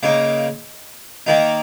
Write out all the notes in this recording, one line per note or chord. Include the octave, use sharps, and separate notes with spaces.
C#3 A#3 D#4
D#3 A#3 D#4